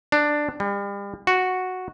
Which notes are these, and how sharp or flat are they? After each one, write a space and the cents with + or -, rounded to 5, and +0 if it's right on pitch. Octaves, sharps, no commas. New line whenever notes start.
D4 +10
G3 +35
F#4 -5